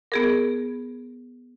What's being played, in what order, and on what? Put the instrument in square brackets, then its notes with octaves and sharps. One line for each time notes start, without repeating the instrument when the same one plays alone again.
[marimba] B3 G#4 A#4